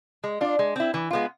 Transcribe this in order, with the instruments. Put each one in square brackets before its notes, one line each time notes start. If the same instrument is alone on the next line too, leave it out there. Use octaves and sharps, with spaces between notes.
[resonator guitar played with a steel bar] G#3
D4 F4
G#3
C4 E4
E3
G#3 B3 F4